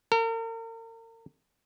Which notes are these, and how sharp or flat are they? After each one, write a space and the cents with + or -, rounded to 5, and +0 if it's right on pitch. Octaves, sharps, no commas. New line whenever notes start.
A#4 -40